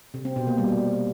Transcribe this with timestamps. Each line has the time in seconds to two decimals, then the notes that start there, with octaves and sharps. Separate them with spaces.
0.14 C3
0.25 C4
0.36 B2
0.47 A#3
0.58 G3